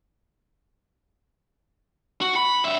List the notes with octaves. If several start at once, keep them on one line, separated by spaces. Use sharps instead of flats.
F#4
B5
G2 E5